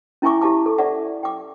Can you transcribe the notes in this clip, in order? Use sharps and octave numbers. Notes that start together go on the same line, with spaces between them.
C#4 E4 E5 G#5 C#6 D6
E4 G4 F5 A5 D6
A4
D5 E5 F#5
G5 D6